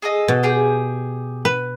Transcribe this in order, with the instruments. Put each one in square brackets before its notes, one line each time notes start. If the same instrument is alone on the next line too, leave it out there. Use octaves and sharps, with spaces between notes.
[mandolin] G#4 A4 D#5
[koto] B2
[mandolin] G4 G#4 G6
[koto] B4